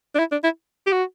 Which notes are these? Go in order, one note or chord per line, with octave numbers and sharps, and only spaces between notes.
D4
E4
D4
E4
G4
F#4